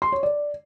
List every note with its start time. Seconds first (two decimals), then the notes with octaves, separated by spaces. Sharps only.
0.02 C6
0.12 C#5
0.23 D5